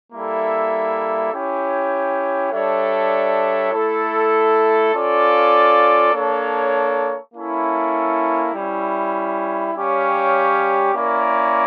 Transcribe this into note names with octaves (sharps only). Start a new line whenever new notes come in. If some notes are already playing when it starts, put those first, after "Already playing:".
G3 A#3 E4 A4 E5
C#4 E4 G4 C#5 G5
G3 D4 A4 C#5 E5
A3 E4 A4
C#4 F4 A4 D5 F5
A#3 D4 A4 C#5
A#3 C#4 E4 A4
G3 C#4 E4
G3 C#4 G4 C#5 F5
A#3 C#4 E4 A#4 D5